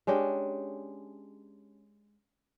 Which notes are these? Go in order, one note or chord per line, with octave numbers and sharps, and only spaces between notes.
G#3 C#4 D4 G4